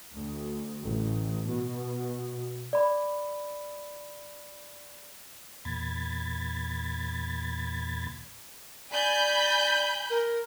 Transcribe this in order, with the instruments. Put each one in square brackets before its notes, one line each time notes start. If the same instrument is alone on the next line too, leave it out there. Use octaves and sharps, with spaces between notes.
[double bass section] D2
A1
B2
[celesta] D5 B5
[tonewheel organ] E2 A#2 B5 G#6 A6
[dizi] D5 [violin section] G#5 B5 G6
[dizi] A#4